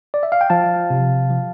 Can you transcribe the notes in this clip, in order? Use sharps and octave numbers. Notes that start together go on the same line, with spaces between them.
D5
E5
F5
G5
F3 F5 A5
C3
F3